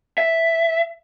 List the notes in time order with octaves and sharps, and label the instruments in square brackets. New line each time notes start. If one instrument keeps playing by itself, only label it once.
[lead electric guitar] E5